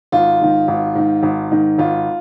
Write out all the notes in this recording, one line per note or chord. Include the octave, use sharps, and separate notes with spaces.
G#1 F4
G#2 D#3
G#1
G#2 D#3
G#1
G#2 D#3
G#1 F4